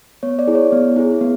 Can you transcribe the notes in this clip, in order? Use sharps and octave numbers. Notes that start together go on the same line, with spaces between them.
B3 C#5
D5
E4 G#4
C#5
B3
E4 G#4
B3